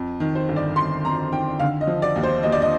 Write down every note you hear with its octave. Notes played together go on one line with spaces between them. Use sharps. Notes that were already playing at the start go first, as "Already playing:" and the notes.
Already playing: F2
D#3
C5
G1
D5
G1 C6
F2 A#5
D#3 G5
D3 F5
D#5
F3
D5
D#2
C5
D#2 D#5
D5
D#5